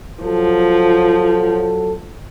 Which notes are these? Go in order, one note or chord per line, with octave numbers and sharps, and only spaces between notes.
F3 F#3 A4